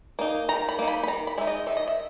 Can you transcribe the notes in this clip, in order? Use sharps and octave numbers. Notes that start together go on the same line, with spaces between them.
A#3 D#4
D#3 A#5
B5
A#3 D#4
B5
B5
D#3 A#5
B5
G#3 D#4 E5
D#5
D#3 E5
D#5
E5